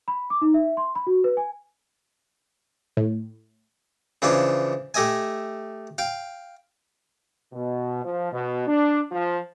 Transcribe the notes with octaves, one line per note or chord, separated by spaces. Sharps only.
B5
D6
D#4
E5
C6
B5
F#4
B4
G#5
A2
C#3 E3 F3 C#4 D4
A3 G4 D#5 E5 G#5
F5 G5
B2
F3
B2
D4
F3